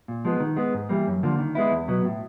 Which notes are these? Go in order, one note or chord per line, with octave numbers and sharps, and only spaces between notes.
A#2
F3 G#3 B3
D#3
G#3 B3
G#2
E3 G3 A#3
F#2
D3 F3 A#3
D#3
G#3 B3 E4
E2
B2 F#3 B3
A2